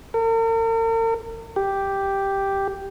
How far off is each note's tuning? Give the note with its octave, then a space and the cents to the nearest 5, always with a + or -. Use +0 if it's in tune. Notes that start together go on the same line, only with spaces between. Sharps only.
A#4 -45
G4 +0